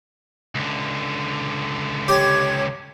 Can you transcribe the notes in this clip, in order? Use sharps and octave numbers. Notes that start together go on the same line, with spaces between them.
C#2 D3
G4 C#5